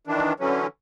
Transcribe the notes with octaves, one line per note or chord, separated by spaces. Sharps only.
D#3 E3 D4
D3 E3 F#3 C#4